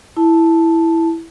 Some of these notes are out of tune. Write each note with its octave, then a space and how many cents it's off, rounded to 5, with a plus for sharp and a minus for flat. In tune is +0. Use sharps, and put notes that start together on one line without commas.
E4 +0 A5 +0